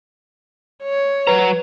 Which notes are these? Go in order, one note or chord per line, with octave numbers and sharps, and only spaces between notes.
C#5
F#3 B4 A#5